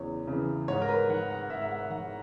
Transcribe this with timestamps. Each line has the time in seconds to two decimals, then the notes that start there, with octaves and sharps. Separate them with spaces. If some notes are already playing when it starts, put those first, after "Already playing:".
Already playing: E2 C#3 E3 C#5
0.27 C#3 E3
0.68 G#2 C#5
0.82 A#4
0.89 B4
1.09 D#3 F#5
1.30 F#5
1.50 G#2 E5
1.62 E5
1.71 F#5
1.90 D#3 F#5